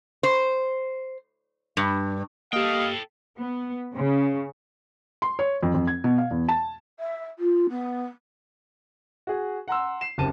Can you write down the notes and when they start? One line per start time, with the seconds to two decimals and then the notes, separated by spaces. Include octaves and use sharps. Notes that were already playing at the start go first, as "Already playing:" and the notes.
0.23 C5
1.77 G2
2.53 A#3 G4 A4 D#5 F5 G5
3.38 B3
3.93 C#3
5.22 C6
5.39 C#5
5.63 F2
5.74 F2
5.87 G#6
6.04 B2
6.18 F5
6.31 E2
6.49 A5
6.99 E5
7.38 F4
7.69 B3
9.27 F#4 G#4
9.68 F#5 A#5 C6 E6
10.01 C7 E7
10.18 F#1 C3 A5 D#7